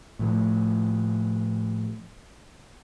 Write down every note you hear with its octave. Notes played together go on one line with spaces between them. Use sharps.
A2 F3 A3